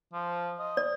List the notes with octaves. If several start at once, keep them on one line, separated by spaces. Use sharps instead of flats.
F3
D#5
D5